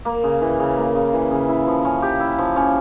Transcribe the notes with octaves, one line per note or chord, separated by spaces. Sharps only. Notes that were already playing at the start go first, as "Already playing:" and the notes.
A#3
C#3
E3
C#3
A#3
C#3
E3
C#3
E4
F3
C#4
G4
E4
F3
C#4